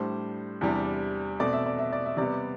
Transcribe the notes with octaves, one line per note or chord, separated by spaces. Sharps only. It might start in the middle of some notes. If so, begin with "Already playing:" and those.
Already playing: A2 G3 D4 C5
E2 C3 G3 D4
B2 A3 C4 D5
E5
D5
E5
D5
E5
C3 G3 B3 D5